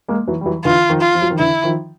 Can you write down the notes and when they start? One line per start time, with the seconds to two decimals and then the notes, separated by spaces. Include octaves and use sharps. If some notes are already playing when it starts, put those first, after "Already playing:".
0.08 G#3 A#3
0.28 E3 F#3
0.41 G3
0.46 E3 F#3
0.65 D3 E3 F4
0.90 D#3 F3
1.01 F4
1.15 F3
1.22 F#3
1.30 D#3 F3
1.39 D3 E3 E4
1.64 D#3 F3